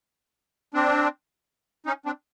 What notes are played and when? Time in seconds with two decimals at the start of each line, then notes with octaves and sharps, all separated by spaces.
0.74 C4 D4
1.86 C#4 D#4
2.06 C4 D4